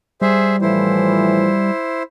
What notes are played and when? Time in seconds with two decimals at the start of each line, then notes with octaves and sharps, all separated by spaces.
0.21 G3 G#4 C5 E5
0.62 A2 E3 F3 E4 C5